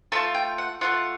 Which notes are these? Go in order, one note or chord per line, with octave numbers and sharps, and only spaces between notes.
A3 D4 F4 A5
G5
F#5
A3 D4 F4 F#5